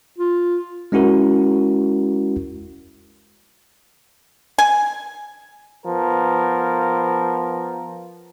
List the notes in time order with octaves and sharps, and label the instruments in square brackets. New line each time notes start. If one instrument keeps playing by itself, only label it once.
[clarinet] F4
[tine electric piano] G#3 C#4 E4 F#4 A#4
[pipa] G#5
[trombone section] F3 B3 A#4